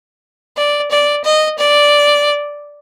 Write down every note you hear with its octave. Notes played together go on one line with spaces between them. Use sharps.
D5
D5
D#5
D5